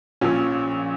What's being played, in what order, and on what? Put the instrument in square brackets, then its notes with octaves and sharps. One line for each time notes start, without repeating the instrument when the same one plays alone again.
[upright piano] A#1 A#2 C#4